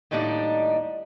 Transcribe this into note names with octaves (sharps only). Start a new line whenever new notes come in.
D#2 A2 G3 D4 D#4 D5